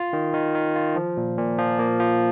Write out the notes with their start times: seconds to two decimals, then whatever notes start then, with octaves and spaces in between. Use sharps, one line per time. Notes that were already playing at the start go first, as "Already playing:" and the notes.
Already playing: F4
0.13 D#3
0.34 D#3
0.55 D#3
0.75 F4
0.96 F3
1.17 A#2
1.38 A#2
1.59 F3
1.79 A#3
1.99 F3